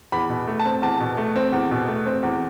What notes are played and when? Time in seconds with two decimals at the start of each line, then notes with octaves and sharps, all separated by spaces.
0.12 E2 B5
0.29 B2
0.47 A3
0.60 A5
0.65 C4
0.82 E2 A5
1.00 B2
1.17 A3
1.36 C4
1.52 E2
1.71 B2
1.88 A3
2.06 C4
2.23 E2